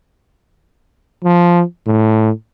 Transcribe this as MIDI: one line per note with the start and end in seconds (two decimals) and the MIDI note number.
1.24 1.62 53
1.87 2.30 45